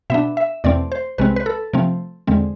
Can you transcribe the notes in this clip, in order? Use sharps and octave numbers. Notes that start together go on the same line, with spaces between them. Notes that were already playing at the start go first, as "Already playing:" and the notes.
B2 B3 D4 E5
E5
E2 B2 A3 C4 D5
C5
C2 C3 G#3 C4 B4
B4
A4
C3 F3 A3 C4
E2 D3 G#3 C4